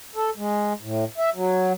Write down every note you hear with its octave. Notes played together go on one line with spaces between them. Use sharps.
A4
G#3
A2
E5
F#3